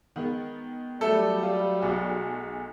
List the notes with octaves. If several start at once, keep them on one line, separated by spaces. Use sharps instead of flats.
D#3 G#3 B3
F#3 G3 A3 A4
F4
B1 F#4 G#4